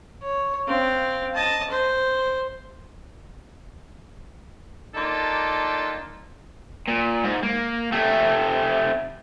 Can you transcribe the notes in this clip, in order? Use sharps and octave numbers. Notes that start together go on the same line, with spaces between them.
C#5
C4 F5
D#5 A5
C5
A#3 D4 D#4 F4 G4 A4
A#2
G#2
A#3
C3 A3